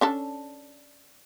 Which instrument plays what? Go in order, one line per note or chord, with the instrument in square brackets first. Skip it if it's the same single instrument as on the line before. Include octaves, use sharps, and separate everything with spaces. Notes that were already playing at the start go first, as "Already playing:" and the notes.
[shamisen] C#4 D4 A4